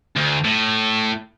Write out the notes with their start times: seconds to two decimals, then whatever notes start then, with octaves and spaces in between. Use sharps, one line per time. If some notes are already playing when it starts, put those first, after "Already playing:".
0.16 D2
0.45 A2